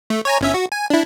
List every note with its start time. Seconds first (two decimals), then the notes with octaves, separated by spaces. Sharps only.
0.10 A3
0.25 C#5 G#5 A#5
0.41 G1 C#4 E5
0.54 F#4
0.72 G#5
0.90 D4 E4